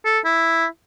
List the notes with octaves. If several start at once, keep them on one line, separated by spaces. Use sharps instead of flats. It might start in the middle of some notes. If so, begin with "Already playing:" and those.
A4
E4